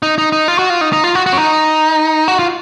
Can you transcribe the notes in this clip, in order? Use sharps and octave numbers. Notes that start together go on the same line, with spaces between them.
D#4
D#4
D#4
F4
F#4
F4
D#4
D#4
F4
F#4
F#4
C#4
D#4
F#4
F4